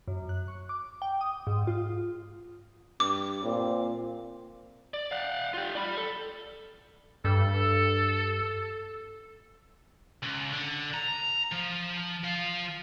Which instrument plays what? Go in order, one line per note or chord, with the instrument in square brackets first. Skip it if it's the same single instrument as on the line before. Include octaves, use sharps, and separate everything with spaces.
[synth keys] F#2
F#6
C#6
D6
G5
D#6
G#2
F4
[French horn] G2 [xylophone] D6
[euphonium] A#2 [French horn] C4
[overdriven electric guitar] D5
F5 F#5
F4 G4
D5 B5
A4
[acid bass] G2 [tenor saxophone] A4
[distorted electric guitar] C#2
D3
A#5
F3
F3 F5